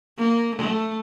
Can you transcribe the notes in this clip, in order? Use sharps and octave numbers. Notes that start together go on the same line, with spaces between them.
A#3
A3